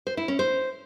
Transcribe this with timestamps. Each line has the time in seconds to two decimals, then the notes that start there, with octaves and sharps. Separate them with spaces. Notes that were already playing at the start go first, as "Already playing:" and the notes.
0.07 C5
0.17 E4
0.28 C#4
0.39 C5